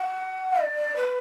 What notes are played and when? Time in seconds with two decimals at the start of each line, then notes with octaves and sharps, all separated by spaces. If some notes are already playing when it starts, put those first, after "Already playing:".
Already playing: F#5
0.61 D5
0.96 B4